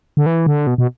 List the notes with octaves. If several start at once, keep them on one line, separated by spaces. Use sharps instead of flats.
D3
E3
D3
B2
B2